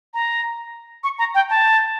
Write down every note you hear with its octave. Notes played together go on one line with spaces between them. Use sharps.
A#5
C#6
A#5
G5
A5